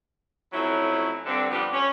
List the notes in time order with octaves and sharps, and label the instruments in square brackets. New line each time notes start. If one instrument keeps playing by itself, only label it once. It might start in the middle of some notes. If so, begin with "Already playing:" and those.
[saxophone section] F2 F#3 A3 C#4 E4
G2 D3 C4
D3 F3 G3 B3 D4 G4
C#4